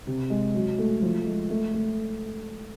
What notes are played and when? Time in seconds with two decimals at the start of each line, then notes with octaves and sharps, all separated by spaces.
0.07 C3
0.30 G#3
0.54 F#3
0.78 A3
1.02 F3
1.26 G#3
1.50 A3
1.74 A3